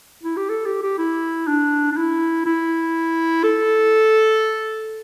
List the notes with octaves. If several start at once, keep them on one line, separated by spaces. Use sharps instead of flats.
E4
G4
A4
G4
G4
E4
D4
D4
E4
E4
A4